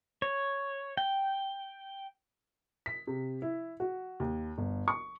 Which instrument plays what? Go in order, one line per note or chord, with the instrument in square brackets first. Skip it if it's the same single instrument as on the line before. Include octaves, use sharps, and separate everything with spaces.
[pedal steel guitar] C#5
G5
[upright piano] B6
C3
E4
F#4
D#2
G1
C#6